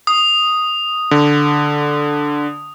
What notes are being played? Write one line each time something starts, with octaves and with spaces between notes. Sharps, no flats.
D#6
D3